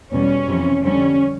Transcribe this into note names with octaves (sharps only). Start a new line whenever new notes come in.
E2 B2 G3 C#4
F2 C3 E3
F2 D3 G3 C#4